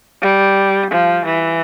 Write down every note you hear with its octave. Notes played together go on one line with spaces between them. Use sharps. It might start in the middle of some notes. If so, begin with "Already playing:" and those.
G3
F3
E3